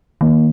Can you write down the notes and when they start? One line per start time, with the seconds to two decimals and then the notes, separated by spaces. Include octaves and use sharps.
0.21 D#3 A#3